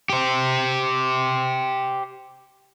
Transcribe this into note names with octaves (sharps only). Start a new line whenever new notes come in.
G4 C5